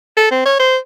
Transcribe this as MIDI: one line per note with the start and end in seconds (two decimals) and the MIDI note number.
0.17 0.29 69
0.31 0.43 60
0.46 0.56 73
0.60 0.77 72